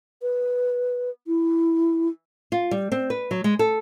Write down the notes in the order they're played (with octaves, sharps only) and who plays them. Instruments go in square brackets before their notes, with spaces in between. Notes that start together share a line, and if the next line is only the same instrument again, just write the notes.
[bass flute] B4
E4
[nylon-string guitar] F4
G3
C4
B4
F#3
G#3
A4